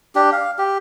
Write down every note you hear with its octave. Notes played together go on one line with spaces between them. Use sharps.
D4 G4
F5
G4